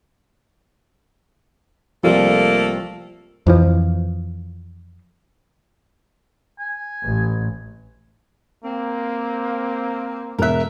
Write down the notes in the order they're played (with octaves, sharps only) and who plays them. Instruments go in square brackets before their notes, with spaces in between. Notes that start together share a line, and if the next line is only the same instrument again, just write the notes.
[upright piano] C2 F3 [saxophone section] A3 A#3 A4
[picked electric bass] F2 E3 F3
[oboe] G#5
[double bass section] A1
[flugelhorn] A#3 [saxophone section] C4
[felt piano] E1 B3 F#6 [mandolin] A#4 E5